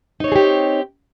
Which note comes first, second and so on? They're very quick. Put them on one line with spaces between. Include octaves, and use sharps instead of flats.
D#4 C#5 C4 G#4 G4